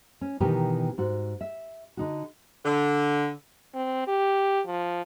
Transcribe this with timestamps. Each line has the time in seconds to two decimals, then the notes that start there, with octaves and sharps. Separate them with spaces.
0.21 C#4
0.40 B2 D#3 E3 B3 G4 A#4
0.98 G#2 F#4
1.41 E5
1.97 D3 D#4 F#4
2.64 D3
3.75 C4
4.07 G4
4.66 F3